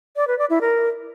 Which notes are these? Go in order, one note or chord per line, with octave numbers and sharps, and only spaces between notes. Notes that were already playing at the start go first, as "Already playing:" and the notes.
D5
B4
D5
E4
A#4